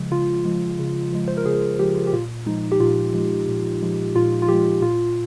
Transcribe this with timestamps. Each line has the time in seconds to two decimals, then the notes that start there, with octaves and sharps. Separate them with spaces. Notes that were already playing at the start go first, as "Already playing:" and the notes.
Already playing: C#3 F3 G#3
0.11 C#3 F4
0.45 F3 G#3
0.79 C#3
1.13 F3 G#3
1.28 C5
1.37 A#4
1.46 C#3 G#4
1.79 F3 G#3 G4
2.07 G4
2.13 A#2 F4
2.46 F3 G#3 D#4
2.72 G4
2.80 A#2 F4
3.14 F3 G#3
3.48 A#2
3.82 F3 G#3
4.15 A#2 F4
4.42 F4
4.48 F3 G#3 G4
4.82 A#2 F4